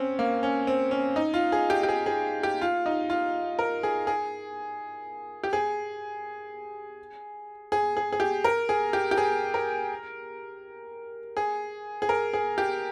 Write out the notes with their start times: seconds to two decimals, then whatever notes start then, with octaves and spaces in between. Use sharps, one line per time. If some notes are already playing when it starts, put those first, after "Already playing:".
Already playing: C4 C#4
0.19 A#3
0.43 C#4
0.67 C4
0.91 C#4
1.16 D#4
1.34 F4
1.52 G#4
1.70 G4
1.83 G4
1.89 G#4
2.06 G#4
2.43 G4
2.61 F4
2.86 D#4
3.10 F4
3.59 A#4
3.83 G#4
4.07 G#4
5.44 G4
5.53 G#4
7.72 G#4
7.97 G#4
8.12 G#4
8.20 G4
8.44 A#4
8.69 G#4
8.93 G4
9.11 G4
9.18 G#4
9.54 A#4
11.37 G#4
12.02 G#4
12.09 A#4
12.33 G#4
12.58 G4